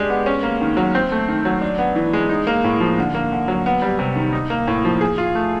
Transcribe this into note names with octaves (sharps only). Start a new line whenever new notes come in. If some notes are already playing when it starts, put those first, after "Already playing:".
Already playing: G#3 D4 G4
B3
C#4
A#3
D#3
F#3
C4
A3
D#3
F#3
D4
B3
E3
G#3
D#4
A#3
A2
F3
D3
A#3
D3
F#3
B3
G3
C3
D#3
D#4
A#3
A2
F3
G#4
F4
A3